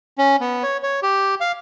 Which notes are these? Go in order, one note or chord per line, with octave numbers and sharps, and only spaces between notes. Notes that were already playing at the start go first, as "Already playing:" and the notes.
C#4
B3
C#5
C#5
G4
F5